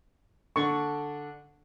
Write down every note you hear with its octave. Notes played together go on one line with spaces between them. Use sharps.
D3 D4 A4 C#6